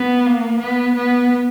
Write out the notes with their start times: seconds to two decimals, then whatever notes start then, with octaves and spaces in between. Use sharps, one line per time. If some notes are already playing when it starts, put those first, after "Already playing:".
Already playing: B3
0.26 A#3
0.60 B3
0.95 B3